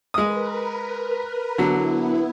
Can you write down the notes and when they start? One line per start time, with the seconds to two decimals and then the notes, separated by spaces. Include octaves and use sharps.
0.14 G#3 A#4 B4 D#6
1.58 D3 F#3 B3 E4